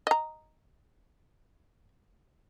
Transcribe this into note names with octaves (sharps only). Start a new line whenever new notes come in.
D#5 A#5